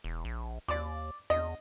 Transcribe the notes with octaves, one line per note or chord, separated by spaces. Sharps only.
E1
A#1
D#2 D5 D6
E2 D#5